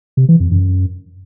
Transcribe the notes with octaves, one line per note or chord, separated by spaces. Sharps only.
C3
E3
F2
F#2